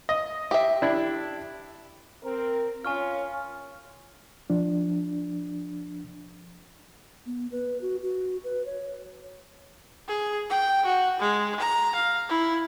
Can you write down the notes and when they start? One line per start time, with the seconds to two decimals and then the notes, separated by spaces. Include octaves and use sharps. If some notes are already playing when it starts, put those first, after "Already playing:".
0.09 D#5
0.51 G4 E5
0.82 D4 E4
2.23 C4 A#4
2.85 C#4 F4 G#5 C#6 F6
4.50 F3 D4
7.26 B3
7.52 B4
7.82 F#4
8.02 F#4
8.44 B4
8.66 C#5
10.08 G#4
10.50 G5
10.85 F#4
11.20 G#3
11.60 A#5
11.95 F5
12.29 E4